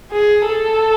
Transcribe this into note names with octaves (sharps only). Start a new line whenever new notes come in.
G#4
A4